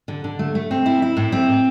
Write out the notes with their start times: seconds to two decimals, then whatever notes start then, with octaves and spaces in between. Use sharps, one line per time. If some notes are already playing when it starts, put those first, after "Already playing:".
0.08 D3
0.24 D3
0.39 A3
0.55 A3
0.71 C4
0.86 E4
1.02 E4
1.17 A2
1.32 C4